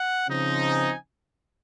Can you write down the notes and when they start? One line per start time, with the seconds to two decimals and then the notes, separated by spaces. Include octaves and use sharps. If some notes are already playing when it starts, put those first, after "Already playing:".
Already playing: F#5
0.28 C#3 F3 C4 D#4
0.68 G#5